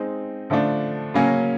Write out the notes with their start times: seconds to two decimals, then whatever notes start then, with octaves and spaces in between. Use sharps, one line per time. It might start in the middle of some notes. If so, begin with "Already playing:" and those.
Already playing: G#3 C4 D#4
0.50 D3 F3 A3 D4
1.14 C#3 F#3 A#3 C#4